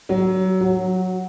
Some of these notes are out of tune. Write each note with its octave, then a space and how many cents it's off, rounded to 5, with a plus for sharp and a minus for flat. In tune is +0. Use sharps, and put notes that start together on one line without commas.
F#3 +20
F#3 -5